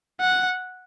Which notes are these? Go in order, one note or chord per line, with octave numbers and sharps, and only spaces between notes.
F#5